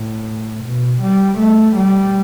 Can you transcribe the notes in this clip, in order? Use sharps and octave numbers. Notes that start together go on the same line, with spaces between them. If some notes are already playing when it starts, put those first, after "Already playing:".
Already playing: A2
B2
G3
A3
G3